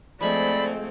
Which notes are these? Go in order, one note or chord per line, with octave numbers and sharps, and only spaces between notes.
F3 G#3 A3 C4 D5 B5